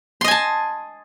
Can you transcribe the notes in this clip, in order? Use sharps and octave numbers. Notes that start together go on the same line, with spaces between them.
D#5 G#5 A5 C6